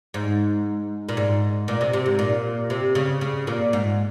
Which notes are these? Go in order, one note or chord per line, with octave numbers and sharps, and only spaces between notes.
G#2
A#2
G#2
A#2
C3
C3
G#2
A#2
C3
C#3
C#3
A#2
G#2